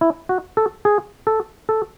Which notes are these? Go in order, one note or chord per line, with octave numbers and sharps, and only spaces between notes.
E4
F#4
A4
G#4
A4
A4